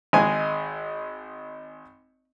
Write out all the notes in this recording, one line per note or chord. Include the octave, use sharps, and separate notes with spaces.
G#1 G#3 G#5